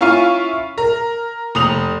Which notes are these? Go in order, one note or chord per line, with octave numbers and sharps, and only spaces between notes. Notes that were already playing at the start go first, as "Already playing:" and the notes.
C#4 E4 F4 F5 C#6 D#7
A#4
F1 D#6 F7 F#7